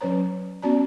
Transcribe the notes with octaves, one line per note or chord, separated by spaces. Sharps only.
F#3 C#4 B4 C#5 A#5
B3 C#4 F#4 D5 A5 A#5